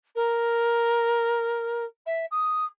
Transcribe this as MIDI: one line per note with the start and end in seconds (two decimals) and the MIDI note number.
0.15 1.84 70
2.06 2.25 76
2.31 2.64 87